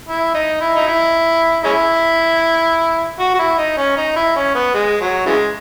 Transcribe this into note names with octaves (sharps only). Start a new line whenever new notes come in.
E4
D#4
E4
D#4
E4
G#3 C#4 E4
F#4
F#4
E4
D#4
C#4
D#4
E4
C#4
B3
G#3
F#3
C#3 E3 G#3